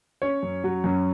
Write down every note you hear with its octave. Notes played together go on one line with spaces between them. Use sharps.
C#4 C#5
F#2
F#3
F#2